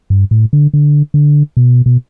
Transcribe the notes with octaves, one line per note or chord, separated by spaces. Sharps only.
G2
A2
D3
D3
D3
B2
B2